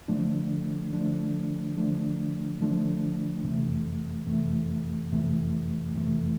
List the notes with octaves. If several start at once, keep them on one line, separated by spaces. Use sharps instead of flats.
D3 F3 A3 D4
D3 F3 A3 D4
D3 F3 A3 D4
D3 F3 A3 D4
F2 C3 E3 A3
F2 C3 E3 A3
F2 C3 E3 A3
F2 C3 E3 A3